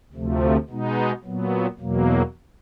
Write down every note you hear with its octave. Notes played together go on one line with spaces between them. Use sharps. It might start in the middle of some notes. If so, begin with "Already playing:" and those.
D2 C3 F3 A3
B2 G#3 B3 D#4
A#2 F#3 B3
E2 B2 F#3 A#3